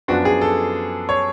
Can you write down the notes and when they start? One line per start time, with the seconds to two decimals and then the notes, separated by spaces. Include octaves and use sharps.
0.08 F#2 F3 B3 D4 F#4
0.25 G#4
0.41 A4
1.09 C#5